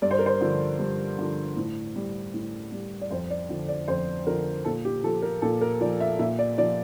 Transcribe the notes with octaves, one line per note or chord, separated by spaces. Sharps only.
G2 D5
C5
A#4
C5
D3 F3
G2
D3 F3
A2
G3
A2
G3
D5
F2 C5
D5
D3 F3
D5
F2 C5
D3 F3 A#4
A#2 A4
G4
F3 A4
A#4
A#2 A4
A#4
F3 D5
E5
A#2 E5
D5
F3 D5